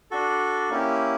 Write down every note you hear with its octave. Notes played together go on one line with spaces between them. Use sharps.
D4 F#4 A4
A#3 C#4 E4 G4